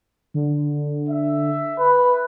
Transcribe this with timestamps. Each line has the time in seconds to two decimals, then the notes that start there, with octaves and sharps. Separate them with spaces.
0.34 D3
1.09 E5
1.79 B4